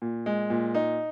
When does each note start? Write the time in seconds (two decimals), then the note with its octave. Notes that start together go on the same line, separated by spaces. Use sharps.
0.02 A#2
0.26 G#3
0.50 A#2
0.75 D#4